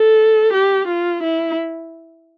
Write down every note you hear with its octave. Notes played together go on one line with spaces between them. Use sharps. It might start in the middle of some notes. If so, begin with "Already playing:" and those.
Already playing: A4
G4
F4
E4